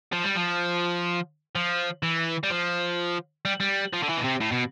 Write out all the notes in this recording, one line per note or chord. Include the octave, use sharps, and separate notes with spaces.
F3
G3
F3
F3
E3
G3
F3
G3
G3
F3
D3
E3
B2
C3
A2
B2